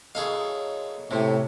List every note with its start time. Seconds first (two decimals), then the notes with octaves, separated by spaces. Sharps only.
0.15 F#2 A2 G#4 A4 D#5 F5
1.11 A2 C3 C#4 G4 C5